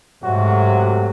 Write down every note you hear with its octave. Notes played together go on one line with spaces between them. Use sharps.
G#2 C3 F#3 A3 F#4